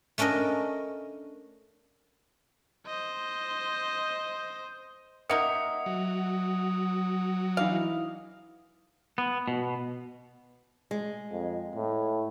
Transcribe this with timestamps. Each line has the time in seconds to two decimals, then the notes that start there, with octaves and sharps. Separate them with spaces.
0.18 A3 C#4 D4 A#4 D#5
2.86 C5 D#5
5.30 A#3 D#4 A#4 E5 F#5 D#6 C#7
5.86 F#3
7.57 E3 D#4 E4 F5
9.18 B3
9.48 B2
10.91 G#3
11.32 F2
11.76 A2